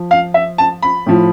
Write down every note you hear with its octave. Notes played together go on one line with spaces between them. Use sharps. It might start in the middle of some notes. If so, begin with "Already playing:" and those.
Already playing: F3
F5
E5
A5
B5
A2 F3